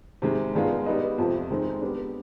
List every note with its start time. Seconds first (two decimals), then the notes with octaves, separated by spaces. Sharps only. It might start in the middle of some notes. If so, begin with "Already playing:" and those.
0.22 C3 D#3 G#3
0.54 G2 D#3 G#3 B3 F4
0.86 G3 B3 D#4 B4 D#5
1.18 F2 C3 F3
1.50 D#3 G#3 C4 D#4
1.81 G3 B3 D4